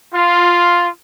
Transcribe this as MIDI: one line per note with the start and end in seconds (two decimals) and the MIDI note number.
0.15 0.88 65